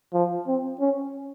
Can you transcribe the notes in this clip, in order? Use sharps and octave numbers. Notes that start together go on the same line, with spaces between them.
F3
C4
C#4